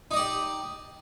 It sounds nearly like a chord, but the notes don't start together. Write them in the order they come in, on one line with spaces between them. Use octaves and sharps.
D#4 D#5 D5 G4